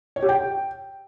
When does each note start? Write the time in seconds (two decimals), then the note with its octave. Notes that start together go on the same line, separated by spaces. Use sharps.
0.16 C#5
0.22 G4
0.29 G5